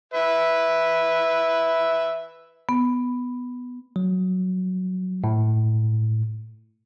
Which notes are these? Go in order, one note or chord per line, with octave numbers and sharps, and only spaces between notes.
B4 E5
B3
F#3
A2